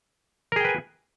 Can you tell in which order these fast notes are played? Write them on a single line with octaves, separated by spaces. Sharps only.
A#4 G#4 G5 B4 G#5